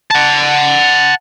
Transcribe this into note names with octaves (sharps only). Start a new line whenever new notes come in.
F#5 A5